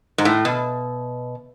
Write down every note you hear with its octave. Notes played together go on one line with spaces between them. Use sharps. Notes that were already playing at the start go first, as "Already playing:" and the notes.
G#2
A2
B2